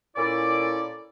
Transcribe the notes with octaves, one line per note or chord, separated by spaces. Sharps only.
A#2 C#4 E4 A4 D5